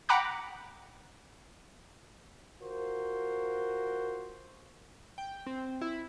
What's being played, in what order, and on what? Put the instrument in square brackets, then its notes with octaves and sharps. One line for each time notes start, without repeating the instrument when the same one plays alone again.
[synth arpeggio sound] F#5 G5 A#5 B5 D6 F#6
[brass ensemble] F4 F#4 A#4 C5
[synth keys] G5
C4
E4